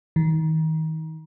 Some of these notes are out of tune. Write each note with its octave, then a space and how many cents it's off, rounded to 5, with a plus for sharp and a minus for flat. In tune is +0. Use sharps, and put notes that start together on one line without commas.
D#3 +30